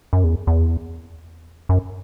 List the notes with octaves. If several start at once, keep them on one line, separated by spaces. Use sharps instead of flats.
F#2
E2
E2
F#2